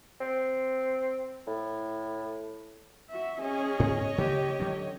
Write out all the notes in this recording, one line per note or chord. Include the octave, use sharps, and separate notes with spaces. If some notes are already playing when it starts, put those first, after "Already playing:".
C4
A2
F#4 E5
C#4 G#4 C#5 D#5
G#2 D3 B3
C#3 A#3 G4
D3 F#3 C#4